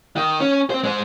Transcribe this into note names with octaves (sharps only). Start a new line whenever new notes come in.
D#3
C#4
C4 C5
G#3 C5